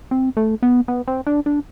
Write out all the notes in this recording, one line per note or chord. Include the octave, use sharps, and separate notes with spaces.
C4
A3
B3
B3
C4
D4
D4